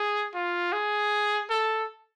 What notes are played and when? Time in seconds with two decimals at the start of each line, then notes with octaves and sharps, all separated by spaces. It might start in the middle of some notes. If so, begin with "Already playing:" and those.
Already playing: G#4
0.34 F4
0.72 G#4
1.50 A4